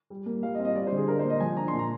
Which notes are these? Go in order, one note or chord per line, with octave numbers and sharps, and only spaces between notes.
G3
A#3
G3 F5
D#5
C4 F5
D#5
G3 D5
C5
D3 G#4
D4 A#4
C5
A#3
D#5
F3 G#5
D4 A#5
C6
A#2
A#5